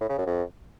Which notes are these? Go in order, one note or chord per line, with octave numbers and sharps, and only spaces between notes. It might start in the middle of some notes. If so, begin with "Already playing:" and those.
A2
C#3
F#2
F2